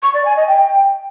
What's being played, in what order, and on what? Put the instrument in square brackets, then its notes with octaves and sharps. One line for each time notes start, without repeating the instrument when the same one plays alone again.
[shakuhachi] C#6
D5
G#5
D#5
G5